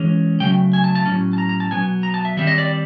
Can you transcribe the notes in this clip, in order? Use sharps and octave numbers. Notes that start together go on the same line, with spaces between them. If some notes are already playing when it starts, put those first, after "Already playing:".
Already playing: E3 G#3 C#4
C#3 F#3 A3 G5
G#5
A5
A5
A2 F#3 A#3 C#4
A5
A#5
A#5
A5
B2 F#3 B3 G#5
A#5
A5
E5
D#3 G3 C4 E5
D#5
D5